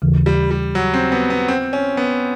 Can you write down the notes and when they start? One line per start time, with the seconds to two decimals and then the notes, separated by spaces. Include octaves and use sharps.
0.02 D#2 C#3 E3
0.26 G3
0.51 G3
0.75 F#3
0.94 C4
1.12 B3
1.30 B3
1.48 C4
1.73 C#4
1.97 B3